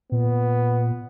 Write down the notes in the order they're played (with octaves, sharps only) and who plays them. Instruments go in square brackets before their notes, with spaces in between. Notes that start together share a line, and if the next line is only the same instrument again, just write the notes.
[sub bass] A#2 [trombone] B3